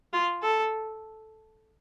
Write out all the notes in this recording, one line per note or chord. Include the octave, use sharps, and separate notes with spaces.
F4
A4